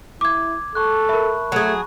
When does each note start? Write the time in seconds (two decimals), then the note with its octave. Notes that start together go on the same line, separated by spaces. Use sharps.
0.21 E4 D6 G#6
0.75 A4 A5 C#6 F#6
1.09 A#4 E5 B5
1.52 F#3 A3 G#4